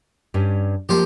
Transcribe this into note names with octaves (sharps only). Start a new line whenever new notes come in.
G2 G3 C#4
F3 A#3 G4 C5